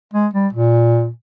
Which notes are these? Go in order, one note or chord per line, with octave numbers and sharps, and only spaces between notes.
G#3
G3
A#2